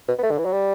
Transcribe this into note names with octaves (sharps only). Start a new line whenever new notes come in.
B2
B3
A3
D3
E3
F#3
G3